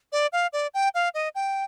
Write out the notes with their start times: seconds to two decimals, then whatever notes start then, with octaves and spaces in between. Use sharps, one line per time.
0.12 D5
0.33 F5
0.53 D5
0.74 G5
0.95 F5
1.14 D#5
1.35 G5